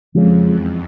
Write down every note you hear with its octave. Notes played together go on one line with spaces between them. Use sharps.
F2 C#3 F3 G#3
E2